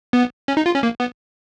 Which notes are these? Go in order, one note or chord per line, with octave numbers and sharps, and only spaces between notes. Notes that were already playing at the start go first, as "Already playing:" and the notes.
B3
C#4
D#4
F4
C#4
A#3
B3